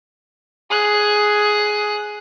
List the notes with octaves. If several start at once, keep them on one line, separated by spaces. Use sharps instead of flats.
G#4 F#6